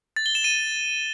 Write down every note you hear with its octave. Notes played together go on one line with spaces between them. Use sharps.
A6
G7
E7
D#7